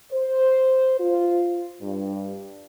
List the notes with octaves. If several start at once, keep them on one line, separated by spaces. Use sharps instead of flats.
C5
F4
G2